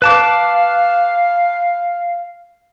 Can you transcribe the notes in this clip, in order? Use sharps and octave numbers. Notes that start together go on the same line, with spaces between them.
B4 F5 A5 D6